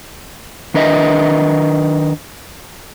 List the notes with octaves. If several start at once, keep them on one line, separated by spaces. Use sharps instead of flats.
D#3 D4 A#4 B4 D#5 E5